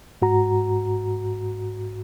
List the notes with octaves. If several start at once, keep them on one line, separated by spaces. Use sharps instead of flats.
G#2 F#4 A#5